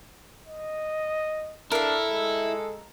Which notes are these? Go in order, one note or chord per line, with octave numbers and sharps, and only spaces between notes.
D#5
D4 E4 A4 A#4 F5
G#3